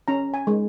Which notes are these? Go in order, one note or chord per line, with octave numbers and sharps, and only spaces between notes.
C#4 A#5
G#5
G#3